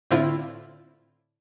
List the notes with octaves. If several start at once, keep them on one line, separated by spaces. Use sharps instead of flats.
A2 D3 C4 E4 F4